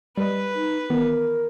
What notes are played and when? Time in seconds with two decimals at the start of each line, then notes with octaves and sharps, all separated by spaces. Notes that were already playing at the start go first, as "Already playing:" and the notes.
0.17 G3 B4 D#5
0.54 D#4
0.90 D#3 E3 B3 A#4